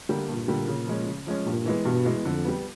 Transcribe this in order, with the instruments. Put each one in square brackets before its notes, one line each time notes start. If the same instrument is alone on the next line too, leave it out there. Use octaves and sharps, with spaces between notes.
[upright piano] D3 G3 A#3
[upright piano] G2 [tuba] A#2
[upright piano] D3 G3 A#3
C#3
F3 G#3 C#4
C#3
F3 G#3 C#4
[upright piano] G2 [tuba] A#2
[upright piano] E3 G#3 B3
[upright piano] G2 [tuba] B2
[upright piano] E3 G#3 B3
[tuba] F2 [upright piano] D3
[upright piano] G3 B3